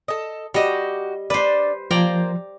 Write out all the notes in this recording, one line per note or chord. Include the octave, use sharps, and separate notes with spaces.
A4 D#5
G3 F#4 G4 D#5
D4 B4 C5 D5
F3 A#3 C5 D5 G5 A#5